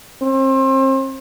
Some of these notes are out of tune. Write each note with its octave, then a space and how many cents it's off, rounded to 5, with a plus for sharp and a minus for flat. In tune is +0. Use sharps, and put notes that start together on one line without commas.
C4 +35